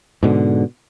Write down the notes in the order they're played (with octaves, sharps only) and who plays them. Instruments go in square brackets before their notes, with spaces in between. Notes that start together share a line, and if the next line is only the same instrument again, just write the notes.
[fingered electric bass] G#2 B2 D3